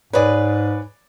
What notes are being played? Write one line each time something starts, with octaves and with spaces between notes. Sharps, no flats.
G#2 G#4 B4 C#5 D5